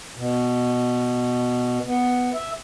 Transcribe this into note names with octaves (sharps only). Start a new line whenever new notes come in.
B2
B3
E5